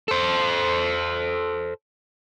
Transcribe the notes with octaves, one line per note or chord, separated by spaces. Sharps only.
A4 C5